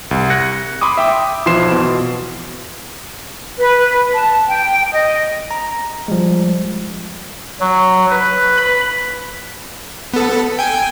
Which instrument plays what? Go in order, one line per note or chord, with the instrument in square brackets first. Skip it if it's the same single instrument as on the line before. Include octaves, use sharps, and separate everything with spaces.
[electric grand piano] C2
F#6 G#6 A#6 C#7
B5 C6 D6 D#6
E5 G5 D6 D#6
B1 E3 F3 C6 C7 E7
B2
[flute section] B4
A5
G5
D#5
[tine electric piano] A#5
F3 G3 G#3
[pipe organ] F#3
B4
B5
[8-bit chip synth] B3 A4
G5 G#5